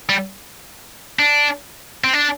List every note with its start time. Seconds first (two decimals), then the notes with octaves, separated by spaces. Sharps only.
0.09 G3
1.19 D4
2.04 C4
2.13 D4